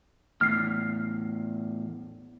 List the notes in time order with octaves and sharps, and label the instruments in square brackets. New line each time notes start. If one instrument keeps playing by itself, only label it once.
[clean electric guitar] E2 A2 [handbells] F6 C7